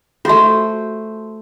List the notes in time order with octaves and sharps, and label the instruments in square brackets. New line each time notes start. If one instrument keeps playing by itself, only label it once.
[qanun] A3 C5 [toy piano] F4 F#4